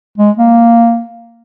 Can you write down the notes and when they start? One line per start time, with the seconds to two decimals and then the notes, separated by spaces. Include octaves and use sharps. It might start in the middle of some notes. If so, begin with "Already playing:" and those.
0.18 G#3
0.37 A#3